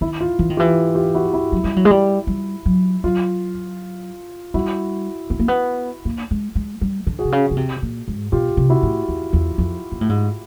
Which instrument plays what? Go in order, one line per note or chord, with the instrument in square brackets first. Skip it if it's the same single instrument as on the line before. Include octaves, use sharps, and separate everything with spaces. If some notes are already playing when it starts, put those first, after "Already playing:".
[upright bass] D#3 [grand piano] E4
[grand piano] F4
[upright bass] E3
D#3
[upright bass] E3 [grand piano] F4 G4
[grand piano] F4 G4
E4 F#4
E4
[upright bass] F#3
G3
F#3
G#3
G3
G3
F#3
[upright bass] F#3 [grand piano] F4
[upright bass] G3 [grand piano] E4 F#4
[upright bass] B3
A#3
B3
A#3
G#3
G#3
G3
D3
[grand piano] F#4 G#4
[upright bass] C3
C#3
C#3
C3
A#2
G#2
[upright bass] B2 [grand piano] F4 G4
[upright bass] C3
[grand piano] E4 F#4
[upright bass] A2
E2
E2
F2
A#2
A2
G#2